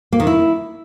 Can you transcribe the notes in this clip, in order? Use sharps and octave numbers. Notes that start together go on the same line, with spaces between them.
A#3
D#3
E4